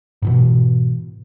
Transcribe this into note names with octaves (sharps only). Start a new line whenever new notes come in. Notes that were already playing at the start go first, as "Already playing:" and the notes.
G#2 B2 E3